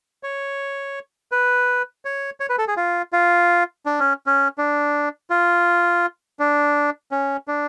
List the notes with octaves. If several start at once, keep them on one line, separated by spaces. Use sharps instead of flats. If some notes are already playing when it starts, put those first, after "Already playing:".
C#5
B4
C#5
C#5
B4
A4
G#4
F4
F4
D4
C#4
C#4
D4
F4
D4
C#4
D4